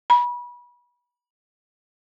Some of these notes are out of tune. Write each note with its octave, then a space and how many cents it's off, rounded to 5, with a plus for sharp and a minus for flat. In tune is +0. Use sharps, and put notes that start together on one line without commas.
B5 -30